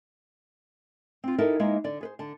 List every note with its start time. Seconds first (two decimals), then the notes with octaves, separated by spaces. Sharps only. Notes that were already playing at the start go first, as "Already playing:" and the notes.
1.24 C4 F4
1.38 D#4 E4 G4 A4 A#4
1.60 G#3 A#3 B3 D#4 E4
1.84 D3 D5
2.01 G#4 B4 C5
2.19 D3 A5